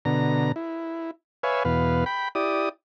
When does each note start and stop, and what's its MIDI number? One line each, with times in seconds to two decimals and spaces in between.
0.05 0.52 47
0.05 0.52 50
0.05 0.52 82
0.56 1.11 64
1.43 1.63 71
1.43 1.63 73
1.43 1.63 76
1.43 1.63 77
1.43 1.63 80
1.65 2.04 40
1.65 2.04 47
1.65 2.04 71
1.65 2.04 77
2.06 2.28 79
2.06 2.28 83
2.35 2.69 64
2.35 2.69 67
2.35 2.69 74
2.35 2.69 87